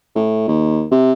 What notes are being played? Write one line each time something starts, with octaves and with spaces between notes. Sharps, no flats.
A2
D#2
C3